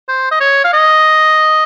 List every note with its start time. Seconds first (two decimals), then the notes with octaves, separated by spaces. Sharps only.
0.09 C5
0.31 D#5
0.41 C#5
0.64 F5
0.73 D#5